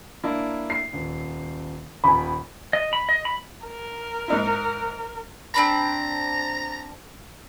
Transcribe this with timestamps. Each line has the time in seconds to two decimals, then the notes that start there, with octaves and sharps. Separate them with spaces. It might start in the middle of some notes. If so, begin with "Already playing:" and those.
0.24 A#3 D4 E4
0.70 C7
0.93 D#1
2.04 D#1 D#3 G#5 B5
2.73 D#5
2.93 B5
3.09 D#5
3.25 B5
3.66 A#4
4.28 G#2 D#4 E4
5.54 C4 D4 A#5 B5